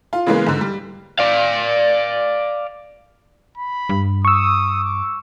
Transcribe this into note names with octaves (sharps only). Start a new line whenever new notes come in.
F4
C#3 E3 G#3 A#3 B3
G#2 D3
G3
D5 F5
B5
G2
C#6 D#6 E6
D6